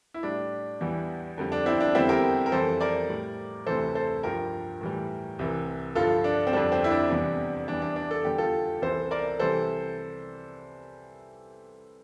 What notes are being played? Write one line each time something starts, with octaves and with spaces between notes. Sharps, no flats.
E4
A2 G3 D4
E2 E3 G3
F2 D3 G3
D4
C4 E4
D4
E2 D3 G3 C4 E4
G4 A#4
A#4
F2 E3 G3 A4 C5
A#4 D5
A2 G3
D2 C3 E3 A4 C5
A4 C5
G2 F3 G4 A#4
A2 E3 G3
C2 C3 E3
G2 D3 F3 F4 A4
D4
C4
F2 D3 G3 D4
C4
E4
D4
E2 C3 E3 G3
E2 E3 G3 D4
D4
D4
A4
E2 D3 G3 G4
F4 A4
C2 C3 E3 A4 C5
A#4 D5
C3 E3 G3 A4 C5